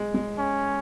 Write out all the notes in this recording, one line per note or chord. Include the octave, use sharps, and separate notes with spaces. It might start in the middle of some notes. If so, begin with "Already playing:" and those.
Already playing: G#3
G#3
C#4